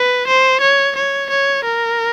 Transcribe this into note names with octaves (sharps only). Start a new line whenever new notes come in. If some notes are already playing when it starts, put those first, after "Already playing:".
Already playing: B4
C5
C#5
C#5
C#5
A#4